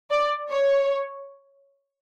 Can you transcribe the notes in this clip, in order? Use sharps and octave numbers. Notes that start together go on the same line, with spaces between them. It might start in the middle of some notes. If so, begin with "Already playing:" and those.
D5
C#5